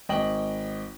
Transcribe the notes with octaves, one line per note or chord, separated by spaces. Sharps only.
G#1 D#5 G5 F#7